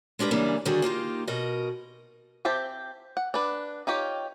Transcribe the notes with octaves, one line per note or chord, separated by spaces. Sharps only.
G#3 D4 G4 A#4 B4
C#3 E3 G3 A#3 D4
D3 D#3 G3 D4 F#4 G#4
A#3 D#4 F4 G4
B2 F#4 A#4 D#5
C4 G4 C5 E5 A5
F#5
D4 B4
D#4 F4 G4 C#5